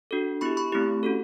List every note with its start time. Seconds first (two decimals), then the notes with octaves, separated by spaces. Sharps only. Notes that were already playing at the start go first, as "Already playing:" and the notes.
0.11 D4 F#4 A4
0.41 B3 E4 G4 B5 C#6
0.57 B5 C#6
0.72 A3 C4 E4 G4
1.03 C#4 F#4 A4